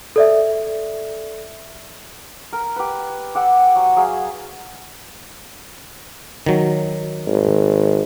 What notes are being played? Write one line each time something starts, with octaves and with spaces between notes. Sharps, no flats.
A4 D5 E5
A#4
G4 B4
G4 F#5 E6
F#3
F#3 G#4 F5
D#3 F#3
G#1